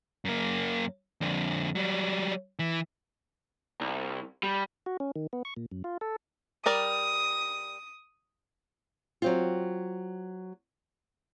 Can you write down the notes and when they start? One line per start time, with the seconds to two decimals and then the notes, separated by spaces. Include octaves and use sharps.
0.25 F#2 A#3
1.21 F2 D3
1.75 F#3 G3
2.59 E3
3.81 C2
4.43 G3
4.86 F#4
5.00 C#4
5.16 D#3
5.33 B3
5.45 C#6
5.57 A#2
5.72 F#2
5.84 F4
6.01 A4
6.66 G3 A#4 D5 D#6
9.22 F#3 C4 F4